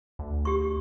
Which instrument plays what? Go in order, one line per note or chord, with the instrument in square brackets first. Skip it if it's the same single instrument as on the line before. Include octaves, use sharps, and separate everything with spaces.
[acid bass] D2
[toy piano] G4 C#6